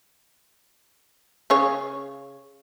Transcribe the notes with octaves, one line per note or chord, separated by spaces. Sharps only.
C#3 G#4 C#5